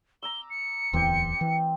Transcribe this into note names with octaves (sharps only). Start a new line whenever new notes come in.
A#5 D6 E6 G7
C#7
D1 E2 E3 C4 G4 G5
E3